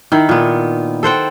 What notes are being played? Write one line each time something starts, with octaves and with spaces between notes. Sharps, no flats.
D#3 E4
A#2 B3
A4 C5 F#5 G5